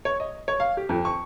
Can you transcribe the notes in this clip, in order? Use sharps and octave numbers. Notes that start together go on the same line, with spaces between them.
C#5
D#5
C#5
F5
G4
F2
C#6